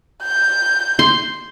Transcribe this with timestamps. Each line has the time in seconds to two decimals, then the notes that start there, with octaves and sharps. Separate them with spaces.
0.22 G6
0.99 C6